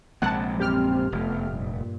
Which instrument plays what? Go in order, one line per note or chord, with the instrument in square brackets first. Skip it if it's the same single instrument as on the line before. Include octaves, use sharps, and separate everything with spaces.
[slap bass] A#1 C3 G#3 [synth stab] F#5 A5
[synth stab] F#2 G4 F6 [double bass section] C4
[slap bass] F1 [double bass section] A3 B3
[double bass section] G2 A#2